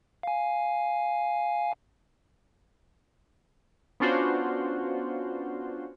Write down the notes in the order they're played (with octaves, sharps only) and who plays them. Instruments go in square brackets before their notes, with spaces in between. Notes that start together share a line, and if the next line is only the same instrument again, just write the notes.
[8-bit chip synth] F5 G#5
[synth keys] B3 C#4 D4 F4 F#4 C5